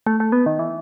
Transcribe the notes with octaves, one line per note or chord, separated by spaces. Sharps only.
A3
A3
B3
D#3
E3